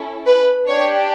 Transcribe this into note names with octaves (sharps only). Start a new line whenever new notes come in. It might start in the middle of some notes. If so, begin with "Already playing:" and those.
Already playing: C#4 E4 A4
B4
D4 G4 C#5